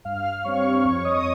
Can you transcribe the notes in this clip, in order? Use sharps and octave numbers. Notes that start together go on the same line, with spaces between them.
G2 F5 F6
G3 C4 C#5 C#6
F2 C#5 C#6
D#5 D#6